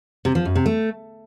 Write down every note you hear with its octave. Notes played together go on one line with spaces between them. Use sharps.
C3
F3
F#2
C3
A3